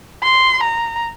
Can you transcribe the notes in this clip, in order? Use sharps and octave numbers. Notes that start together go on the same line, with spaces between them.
C6
A#5